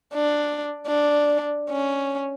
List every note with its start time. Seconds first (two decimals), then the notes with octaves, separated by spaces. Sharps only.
0.14 D4
0.87 D4
1.71 C#4